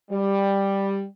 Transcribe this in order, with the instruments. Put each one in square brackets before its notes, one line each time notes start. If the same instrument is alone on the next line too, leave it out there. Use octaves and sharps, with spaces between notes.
[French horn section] G3